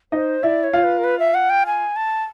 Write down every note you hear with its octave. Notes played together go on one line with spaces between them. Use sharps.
D#4 C5 D#5
E4 D5 E5
C#5
F4 F5
B4
A#4
B4
E5
F#5
G5
G#5
A5